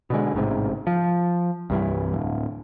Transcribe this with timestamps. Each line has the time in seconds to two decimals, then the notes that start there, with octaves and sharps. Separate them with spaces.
0.10 B2 D3 G#3
0.34 A1 G#2 C3
0.87 F3
1.70 C2 G2 E3
2.14 D1